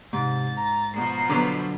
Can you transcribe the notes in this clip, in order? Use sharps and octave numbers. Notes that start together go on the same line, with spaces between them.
G#2 C3 A6
A#5
B2 F3 F#4
D3 F#3 B3